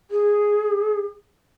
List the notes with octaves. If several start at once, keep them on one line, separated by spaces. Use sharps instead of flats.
G#4